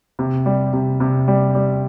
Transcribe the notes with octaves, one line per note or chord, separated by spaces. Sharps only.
C3
G3
C3
C3
G3
G3